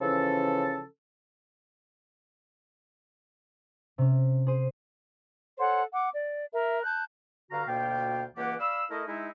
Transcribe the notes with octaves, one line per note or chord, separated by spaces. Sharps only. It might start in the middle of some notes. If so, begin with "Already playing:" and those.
C#3 E3 F3 C#4 A4
C3 C#4
G#4 C5 D#7
A4 C5 C#5 F#5
F#5 D6
D5
A#4 E5
A5 F#6 G6
G2 D3 F#4 F5 A#5
D2 B2 A#3 F4 F5 G5
C#2 E3 A#3 G4 D5 F#5
D5 F5 B5 E6
A3 E4 A#4 D#5
G#3 D#4 E4